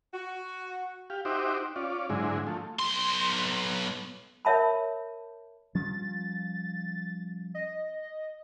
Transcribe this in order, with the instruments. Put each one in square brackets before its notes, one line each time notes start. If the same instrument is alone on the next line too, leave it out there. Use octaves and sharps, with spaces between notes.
[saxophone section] F#4
[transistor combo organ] G4 F5
D#4 F#4 G4 C5 E5 D6
C#4 F4 D5
G#2 D3 F#3 G#3 E4
F3 A3
[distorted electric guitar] B1 C6
[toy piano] A#4 C#5 E5 A5 B5
[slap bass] F3 G3 C#4 [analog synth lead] A6
[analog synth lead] D#5